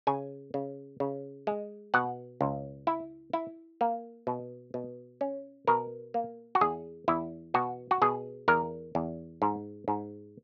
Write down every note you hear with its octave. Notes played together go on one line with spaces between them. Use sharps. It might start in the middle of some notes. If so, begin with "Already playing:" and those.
C#3 G#5
C#3
C#3
G#3
B2 F#5
C#2
E4
E4
A#3
B2
B2
C#4
B2 A#4
A#3
F#4
E2 G#4
E2 E4
B2 F#4
F#4
B2 G#4
E2 A#4
E2
G#2
G#2